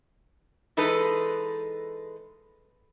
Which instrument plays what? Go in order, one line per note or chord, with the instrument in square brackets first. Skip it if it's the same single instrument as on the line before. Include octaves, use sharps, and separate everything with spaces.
[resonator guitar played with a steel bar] E3 G#3 D#4 A4 B4